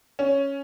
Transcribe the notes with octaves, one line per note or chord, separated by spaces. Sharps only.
C#4